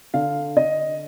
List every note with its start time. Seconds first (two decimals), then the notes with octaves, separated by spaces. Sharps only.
0.14 D3 F5
0.57 D3 D#5